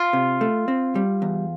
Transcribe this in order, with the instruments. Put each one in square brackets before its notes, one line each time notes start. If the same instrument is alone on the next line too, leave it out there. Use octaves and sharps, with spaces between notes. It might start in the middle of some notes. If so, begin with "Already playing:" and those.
Already playing: [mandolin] F4
[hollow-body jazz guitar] C3
A3
C4
G3
E2